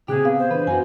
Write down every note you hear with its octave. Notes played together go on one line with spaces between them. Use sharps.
A#2 C#3 C4 G4 G#4 F#6
B3 F5
C5
E3 D4 B4
F#2 C#4 F#4 G#5